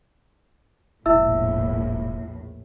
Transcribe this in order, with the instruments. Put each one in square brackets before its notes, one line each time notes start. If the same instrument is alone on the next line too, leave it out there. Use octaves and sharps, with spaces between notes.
[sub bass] E1 [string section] A#1 E2 A2 [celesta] E4 E5 E6